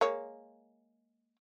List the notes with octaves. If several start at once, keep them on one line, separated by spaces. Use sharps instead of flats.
G#3 A#3 C#5